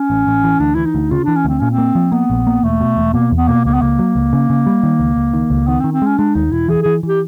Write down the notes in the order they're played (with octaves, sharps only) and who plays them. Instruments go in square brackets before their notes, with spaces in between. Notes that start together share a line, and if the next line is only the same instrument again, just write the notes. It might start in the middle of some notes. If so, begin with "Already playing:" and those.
Already playing: [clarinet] C#4
[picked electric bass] A1
A1
E3
[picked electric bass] D2 [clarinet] D4
[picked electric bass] E3 [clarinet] E4
[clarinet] D#4
[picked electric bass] D2
[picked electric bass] C#3 [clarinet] F4
[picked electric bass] E3 [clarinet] D4
[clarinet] C#4
[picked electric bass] D2 [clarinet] C4
[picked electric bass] A#2 [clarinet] C#4
[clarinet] C4
[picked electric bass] A#3
F3
[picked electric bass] A#3 [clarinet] B3
[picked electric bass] A#1
A#3
[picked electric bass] E1 [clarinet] A3
[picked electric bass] B2
E1
[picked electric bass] B2 [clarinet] A#3
[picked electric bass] E2
[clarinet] B3
[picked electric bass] B2 [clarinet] A#3
[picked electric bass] C#2 [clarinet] A#3
[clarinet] B3
[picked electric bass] C#2 [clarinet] A#3
[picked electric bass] F#3
C#2
C#3
C#3
G3
D#3
C#2
C#2
D#3
C#2
[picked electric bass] D#3 [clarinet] B3
[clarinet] C4
[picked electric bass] D#3
[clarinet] C4
[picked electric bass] G#3 [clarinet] C#4
[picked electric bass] G#3 [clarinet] D4
[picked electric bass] D#2 [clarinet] D#4
[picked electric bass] E1 [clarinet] E4
[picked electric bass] E3 [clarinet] G#4
[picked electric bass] E3 [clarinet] G#4
[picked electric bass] E3 [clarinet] G4